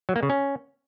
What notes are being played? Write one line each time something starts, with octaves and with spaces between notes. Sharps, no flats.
F#3
A#3
C#3
C#4